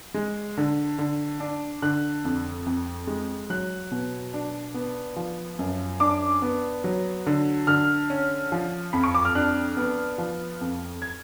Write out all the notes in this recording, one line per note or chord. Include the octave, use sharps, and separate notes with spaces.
G#3
D3
D3
D4
D3 F#6
F2
F2
G#3
F#3 F#6
B2
D4
B3
F3
F#2
D4 D6
B3
F#3
D3
D3 F6
C#4
F3
F2 B5
C#6
D6
F6
D4 F#6
B3
F3
F2
G#6